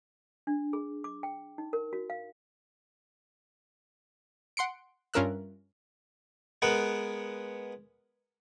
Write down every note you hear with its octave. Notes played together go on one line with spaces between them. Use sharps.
D4
G#4
D6
G5
D#4
A#4
F#4
F5
F#5 C6 C#7 D7
G2 C#4 F4 A#4 E5 F#6
G#3 B3 A#4 B4 F#5